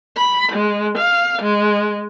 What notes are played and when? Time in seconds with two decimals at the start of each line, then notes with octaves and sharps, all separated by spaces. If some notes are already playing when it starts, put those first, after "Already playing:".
0.18 B5
0.52 G#3
0.98 F5
1.42 G#3